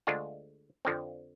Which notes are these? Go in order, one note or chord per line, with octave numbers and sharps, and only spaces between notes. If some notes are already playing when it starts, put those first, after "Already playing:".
D2 D3 G#3 D4 F4
F2 D3 F3 C4